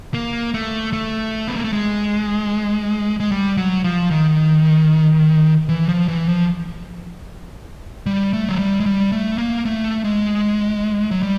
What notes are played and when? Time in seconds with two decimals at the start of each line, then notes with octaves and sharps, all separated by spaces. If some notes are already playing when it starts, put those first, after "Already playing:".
0.14 A#3
0.54 A3
0.93 A3
1.48 B3
1.56 A#3
1.64 A3
1.73 G#3
3.20 G#3
3.32 G3
3.57 F#3
3.84 F3
4.11 D#3
5.69 E3
5.89 F3
6.08 E3
6.29 F3
8.06 G3
8.33 A3
8.49 F#3
8.59 G3
8.80 G#3
8.86 G3
9.12 A3
9.38 A#3
9.65 A3
10.04 G#3
11.11 F#3
11.23 G3